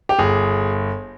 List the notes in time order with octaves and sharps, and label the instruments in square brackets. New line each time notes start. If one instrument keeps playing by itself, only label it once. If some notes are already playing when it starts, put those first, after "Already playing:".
[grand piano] G4
G1 G#4